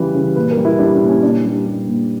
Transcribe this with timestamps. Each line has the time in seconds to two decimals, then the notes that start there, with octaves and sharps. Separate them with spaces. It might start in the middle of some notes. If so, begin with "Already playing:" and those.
Already playing: C#3 E3 G3 B4
0.14 C#3
0.36 A#2 B4
0.51 A#4
0.57 G3
0.65 E4
0.79 G3 D4
0.94 D4
1.02 A#2
1.08 C#4
1.23 A#2 D4
1.44 G3 D4
1.66 G3
1.87 A#2